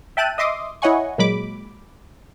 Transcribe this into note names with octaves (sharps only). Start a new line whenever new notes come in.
E5 G5 A5 F#6 D#7
D#5 E5 C6 D6 D#6
E4 C#5 D#5 F#5 G#5 C#6
A#2 F#3 G#3 B5 D6